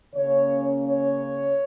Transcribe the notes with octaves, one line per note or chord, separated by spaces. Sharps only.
C#3 A#3 C#4 C#5
C#5